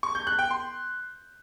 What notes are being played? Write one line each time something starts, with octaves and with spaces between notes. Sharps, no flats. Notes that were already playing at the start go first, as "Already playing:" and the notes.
C#6
G6
F#6
G5
C6